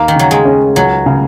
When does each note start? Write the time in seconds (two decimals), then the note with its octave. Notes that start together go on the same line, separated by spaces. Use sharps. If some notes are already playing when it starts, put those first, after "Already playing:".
Already playing: D#2 A#3
0.08 D#3
0.16 C#3 F#3
0.31 G#3
0.45 C#4
0.76 C#2 F#3
1.06 C#3